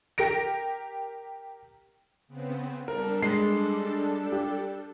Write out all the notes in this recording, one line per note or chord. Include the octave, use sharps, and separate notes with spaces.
G4 A#4 A#6 D7
C#3 B3 C4
G3 D4 A4 A#4
G#3 C7
G4